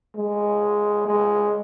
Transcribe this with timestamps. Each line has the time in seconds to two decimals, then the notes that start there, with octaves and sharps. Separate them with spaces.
0.16 G#3
1.07 G#3